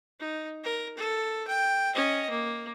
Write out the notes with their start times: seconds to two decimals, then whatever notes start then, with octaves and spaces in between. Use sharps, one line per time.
0.20 D#4
0.63 A#4
0.97 A4
1.47 G5
1.95 C#4 D#5
2.30 A#3